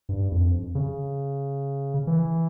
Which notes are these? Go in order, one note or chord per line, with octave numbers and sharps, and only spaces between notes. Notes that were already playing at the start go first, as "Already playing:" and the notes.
G2
F2
C#3
E3